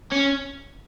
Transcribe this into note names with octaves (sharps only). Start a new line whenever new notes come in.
C#4